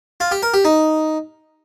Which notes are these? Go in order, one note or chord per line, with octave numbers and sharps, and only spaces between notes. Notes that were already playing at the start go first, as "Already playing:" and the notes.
F4
G4
A#4
G4
D#4